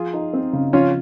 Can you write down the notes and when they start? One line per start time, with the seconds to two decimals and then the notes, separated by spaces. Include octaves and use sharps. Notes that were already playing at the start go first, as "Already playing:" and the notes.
Already playing: F3 F4 G#4
0.14 D#4
0.33 C4
0.53 C#3
0.73 F3 C#4 F4